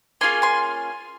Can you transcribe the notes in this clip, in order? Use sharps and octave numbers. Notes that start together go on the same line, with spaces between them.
A#3 C#4 F4 G#4 G#5 C6
G#5 C6